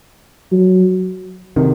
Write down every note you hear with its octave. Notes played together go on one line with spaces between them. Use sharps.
F#3
C3 D#3